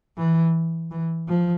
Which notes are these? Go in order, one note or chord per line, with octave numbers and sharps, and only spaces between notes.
E3
E3
F3